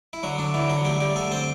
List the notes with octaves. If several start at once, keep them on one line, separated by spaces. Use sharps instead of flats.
E4
D3 F#3 F#4
D3 D4
D3 E3 E4
F#3 F#4
G3 A3 G4
G3 G4
D3 A3 A4
C4 C5